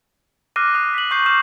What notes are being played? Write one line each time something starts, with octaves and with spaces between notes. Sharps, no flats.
D6 F6 F#6 A#6 C7 D#7
D#6 F6
B6 F#7
C#6 G6 C7
D6 F6 G6 E7